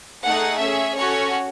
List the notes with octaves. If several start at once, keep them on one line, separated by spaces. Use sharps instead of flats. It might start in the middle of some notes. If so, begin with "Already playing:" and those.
A3 D#4 G#4 F#5
C#4 G#4 E5
C#4 F#4 A4 C#5